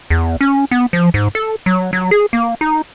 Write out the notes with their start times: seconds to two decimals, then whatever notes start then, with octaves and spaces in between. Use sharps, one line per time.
0.10 E2
0.41 C#4
0.71 B3
0.93 F3
1.14 G#2
1.35 A4
1.66 F#3
1.93 F#3
2.11 G#4
2.33 A#3
2.61 D#4